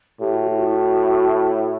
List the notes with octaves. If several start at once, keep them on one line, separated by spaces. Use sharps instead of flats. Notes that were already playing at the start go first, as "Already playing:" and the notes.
A2 G4
F#4
E4
F#4